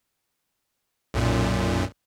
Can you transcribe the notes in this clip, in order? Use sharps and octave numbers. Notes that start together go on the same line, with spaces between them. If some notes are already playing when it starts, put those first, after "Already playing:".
B1 F#2 A#2